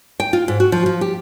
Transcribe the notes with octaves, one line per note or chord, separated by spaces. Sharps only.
G5
F4
G#2
F#4
F3
F3
G4